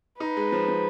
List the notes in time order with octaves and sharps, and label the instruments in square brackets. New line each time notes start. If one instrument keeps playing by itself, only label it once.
[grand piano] D#4 [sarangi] B4
[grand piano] G#3
F3
F3